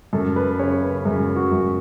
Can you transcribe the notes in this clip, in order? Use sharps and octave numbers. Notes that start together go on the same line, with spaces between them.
F#2 A4
B4
C#3 C#5
B4
F#2 G#4
F#4
F#2